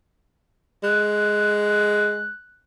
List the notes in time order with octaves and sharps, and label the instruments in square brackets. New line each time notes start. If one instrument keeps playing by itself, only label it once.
[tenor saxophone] G#3 [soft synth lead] F#6